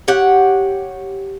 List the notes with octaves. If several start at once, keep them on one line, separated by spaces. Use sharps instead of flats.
G4 C#5 F#5